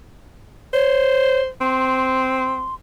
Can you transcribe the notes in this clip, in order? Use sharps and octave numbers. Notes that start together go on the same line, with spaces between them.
C5 C#5
C4 C6